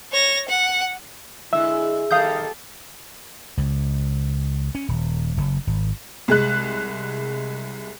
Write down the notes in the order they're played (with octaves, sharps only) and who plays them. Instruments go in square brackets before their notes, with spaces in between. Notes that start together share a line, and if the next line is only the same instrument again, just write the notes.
[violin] C#5 A#6
F#5
[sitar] D3 G#3 [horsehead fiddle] E4 [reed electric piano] E5 E6
[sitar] D#3 G3 A#3 [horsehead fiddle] G4 A4 [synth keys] F5 D#6 G6
[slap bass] C#2
C#4
D#1
F#1
G#1
[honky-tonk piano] C2 G#3 F#6